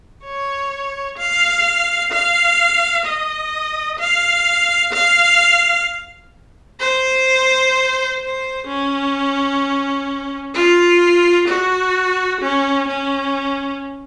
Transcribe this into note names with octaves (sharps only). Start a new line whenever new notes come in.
C#5
F5
F5
D#5
F5
F5
C5
C5
C#4
F4
F#4
C#4
C#4